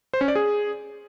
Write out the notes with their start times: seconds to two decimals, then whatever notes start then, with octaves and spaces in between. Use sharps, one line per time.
0.14 C5
0.21 C#4
0.28 D5
0.35 G#4